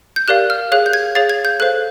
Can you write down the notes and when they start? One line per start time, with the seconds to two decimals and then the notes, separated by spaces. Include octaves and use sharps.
0.16 G6
0.28 G4 A#4 D5 F5 F#6
0.50 F6
0.72 G#4 C#5 F5 F#6
0.86 G6
0.93 G#6
1.15 G#4 C#5 F5 A6
1.30 G#6
1.45 G6
1.60 A4 C5 F5 F#6